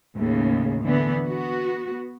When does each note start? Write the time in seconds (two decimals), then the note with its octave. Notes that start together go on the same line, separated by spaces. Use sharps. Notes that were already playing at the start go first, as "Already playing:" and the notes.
0.15 D#2 A2 C#3
0.84 D3 E3 B3
1.26 B3 F#4